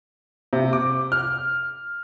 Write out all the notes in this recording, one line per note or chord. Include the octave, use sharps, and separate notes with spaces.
C3
D6
F6